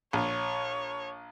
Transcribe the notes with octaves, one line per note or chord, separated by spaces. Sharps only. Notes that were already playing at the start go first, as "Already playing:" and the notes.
A#1 C#5